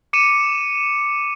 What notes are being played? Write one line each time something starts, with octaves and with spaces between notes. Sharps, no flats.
D6 C#7 D#7 E7